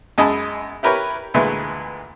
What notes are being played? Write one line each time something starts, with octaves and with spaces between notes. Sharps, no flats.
F#2 G#3 D#5 G#5 A5 B5
E4 G4 A#4 B4 C#5
D2 A#2 E3 G#3 A3 B4